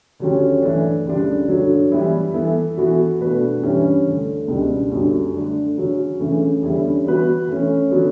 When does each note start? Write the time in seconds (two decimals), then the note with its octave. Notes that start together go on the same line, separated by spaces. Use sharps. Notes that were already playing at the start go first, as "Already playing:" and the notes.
0.20 D2 D3 F#3 C#4 G4
0.62 G2 E3 A3 D4
1.05 D2 C#3 G3 D4
1.48 G2 D3 F#3
1.91 E3 G3 B3 E4
2.34 E3 B3 E4 A4
2.77 E3 B3 F#4 A4
3.20 B2 A3 D4 F#4 B4
3.62 G2 E3 G3 C#4
4.06 D2 D3 A3
4.48 C#2 B2 G3 D4
4.91 F#2 D3 G3
5.34 D3 A3 D4
5.77 C#3 F#3 C#4
6.20 C#3 E3 A3
6.63 E2 D3 G3 C#4 E4
7.06 E3 B3 F#4 B4
7.49 E3 A3 C#4
7.91 D3 F#3 B3 D4